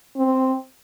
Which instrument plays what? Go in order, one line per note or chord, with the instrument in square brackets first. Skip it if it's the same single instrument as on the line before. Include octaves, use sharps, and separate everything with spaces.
[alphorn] C4